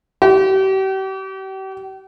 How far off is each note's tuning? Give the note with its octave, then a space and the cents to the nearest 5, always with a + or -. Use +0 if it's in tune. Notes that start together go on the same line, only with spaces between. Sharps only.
G4 -40